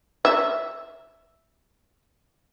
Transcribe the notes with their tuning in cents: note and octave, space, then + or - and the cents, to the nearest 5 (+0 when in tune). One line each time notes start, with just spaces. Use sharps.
E5 +0